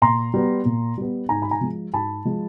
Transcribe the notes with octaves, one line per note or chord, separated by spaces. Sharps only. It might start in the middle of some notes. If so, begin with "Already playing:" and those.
A#2 A#5 C6
G3 B3
A#2
G3 B3
G#2 G#5 A#5
B5
G#5 A#5
F3 G#3
G#2 A5 B5
F3 G#3